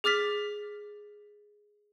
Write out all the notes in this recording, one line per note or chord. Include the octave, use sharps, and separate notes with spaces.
G#4 D6 F6 A6 B6